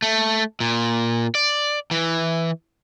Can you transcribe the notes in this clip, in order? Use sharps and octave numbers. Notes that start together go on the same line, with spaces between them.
A3
A#2
D5
E3